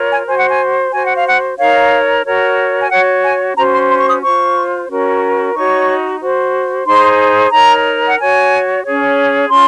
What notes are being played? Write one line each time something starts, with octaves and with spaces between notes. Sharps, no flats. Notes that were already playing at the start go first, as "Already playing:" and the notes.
Already playing: F4 A#4 C#5
G#5
F#4 C5 G#5
F#5
G#5
F#4 C5 G#5
F#5
F5
F#5
D#4 A#4 C#5 F5
F#4 A#4 C#5
G#5
F#4 C#5 F#5
G#5
C#4 F#4 C5 A#5
C6
C6
C#6
D#6
F4 C5 C#6
C#4 F#4 A#4 C#5
D#4 F#4 C#5 C#6
F#4 C5
D#4 G#4 C5 C6
D#4 A#4 C#5 A#5
F#5
F#4 C#5 G#5
C#4 G#4 C#5
C#4 F4 C6